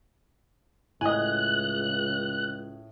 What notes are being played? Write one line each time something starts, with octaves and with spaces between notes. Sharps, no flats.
C#2 A2 D#5 G#5 F#6